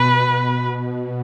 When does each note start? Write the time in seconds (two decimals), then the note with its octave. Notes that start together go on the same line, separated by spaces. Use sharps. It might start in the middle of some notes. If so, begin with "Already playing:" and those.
Already playing: B2 B4
0.58 B2